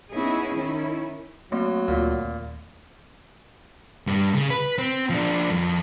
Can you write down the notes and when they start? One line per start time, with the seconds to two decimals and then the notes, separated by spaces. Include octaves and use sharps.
0.11 B3 C#4 D#4 E4 G#4
0.54 D#3 C#4 E4
1.52 F#3 A3 A#3 C4
1.88 D2 A#2 F4
2.24 D#2
4.07 G2 G3
4.34 C#3
4.50 B4
4.78 C4
5.10 F3 D4
5.50 F2